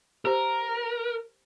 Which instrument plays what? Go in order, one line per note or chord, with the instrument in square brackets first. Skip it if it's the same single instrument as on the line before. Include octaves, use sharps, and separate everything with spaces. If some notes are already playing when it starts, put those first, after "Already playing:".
[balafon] G4 C5 [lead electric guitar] A#4